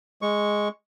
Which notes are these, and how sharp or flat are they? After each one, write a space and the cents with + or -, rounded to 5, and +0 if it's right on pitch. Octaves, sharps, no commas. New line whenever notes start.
G#3 +0 C#6 +0